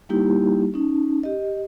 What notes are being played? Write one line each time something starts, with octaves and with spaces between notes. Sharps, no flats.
G3 A#3 D#4 E4 G4
C#4 D#4
G4 D#5